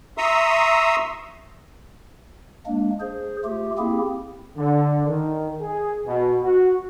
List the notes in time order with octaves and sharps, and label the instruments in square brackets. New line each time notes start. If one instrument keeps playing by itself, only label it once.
[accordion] E5 A#5 C6 C#6 D#6 E6
[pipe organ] G#3 A#3 D4
G#4 C5
A3 F4 G4
A#3 C4 E4 G4 G#4
[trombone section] D3
D#3
G#4
B2
F#4